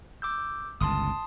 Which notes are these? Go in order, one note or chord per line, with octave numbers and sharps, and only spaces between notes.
D6 E6 G6
G1 C#2 A5 C6 D#6